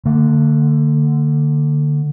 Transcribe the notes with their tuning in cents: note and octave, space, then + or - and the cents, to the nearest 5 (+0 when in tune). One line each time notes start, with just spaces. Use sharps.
D3 +5 A#3 -45